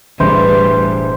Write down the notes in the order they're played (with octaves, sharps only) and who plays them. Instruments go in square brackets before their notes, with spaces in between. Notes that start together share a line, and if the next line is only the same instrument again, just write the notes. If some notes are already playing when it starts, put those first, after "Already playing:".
[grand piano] E1 A2 [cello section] G3 [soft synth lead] B4 [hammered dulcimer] C5